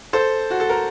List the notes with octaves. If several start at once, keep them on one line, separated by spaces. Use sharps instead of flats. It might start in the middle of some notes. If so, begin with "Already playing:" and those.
A4 C5
F#4
A4
A#4